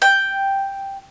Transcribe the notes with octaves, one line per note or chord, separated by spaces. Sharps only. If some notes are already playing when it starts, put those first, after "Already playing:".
G5